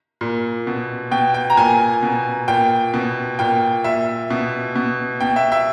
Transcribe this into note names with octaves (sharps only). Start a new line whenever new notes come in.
A#2
B2
B2 G5
G5
A#5
A#2 G#5
B2
A#2 G5
B2
A#2 G5
A#2 E5
B2
B2
B2 G5
E5
E5